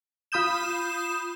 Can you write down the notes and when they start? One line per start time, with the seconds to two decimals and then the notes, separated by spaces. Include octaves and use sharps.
0.32 F4 B5 D#6 G6 E7